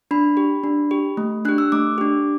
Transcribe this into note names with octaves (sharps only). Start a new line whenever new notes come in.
D4 B5
G4
D4
G4
A3
D4 G4 F#6
E6
A3 D6
D4 G4